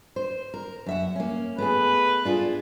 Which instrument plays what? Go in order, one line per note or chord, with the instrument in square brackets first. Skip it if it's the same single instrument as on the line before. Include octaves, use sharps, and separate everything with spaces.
[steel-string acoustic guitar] C5
A#4
F#2 E5 F#5
A#3 C#4
[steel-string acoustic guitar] A3 B3 G#4 [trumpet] B4
[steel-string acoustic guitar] D4 F4 G#4